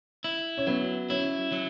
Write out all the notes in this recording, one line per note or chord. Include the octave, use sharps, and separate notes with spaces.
E4
C#4
F#3 B3
C#4 E4
F#3